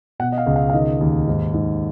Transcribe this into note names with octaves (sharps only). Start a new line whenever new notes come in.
B2 F#5
D#5
F5
C#2
F5
F5
D#3 D#5
D#2
G#2
G#2